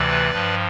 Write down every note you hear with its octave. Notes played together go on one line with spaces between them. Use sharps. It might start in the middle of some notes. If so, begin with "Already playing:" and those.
Already playing: D2 C3 E3 B4 D5
G2 F3